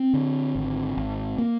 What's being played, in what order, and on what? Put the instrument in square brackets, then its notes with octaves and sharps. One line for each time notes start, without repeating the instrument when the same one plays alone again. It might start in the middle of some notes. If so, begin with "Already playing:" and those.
Already playing: [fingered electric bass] C4
D3
G#1
G#1
A#3